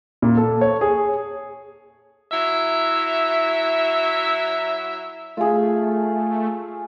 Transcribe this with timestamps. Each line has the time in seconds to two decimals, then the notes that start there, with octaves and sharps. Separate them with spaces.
0.22 A#2
0.37 A4
0.61 C#5
0.81 G#4
2.31 F#3 E4 E5
5.37 A3 F4 G#4